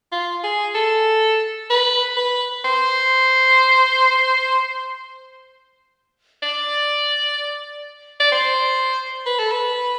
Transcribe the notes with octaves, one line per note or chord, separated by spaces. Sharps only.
F4
G#4
A4
B4
B4
C5
D5
D5
C5
B4
A4
B4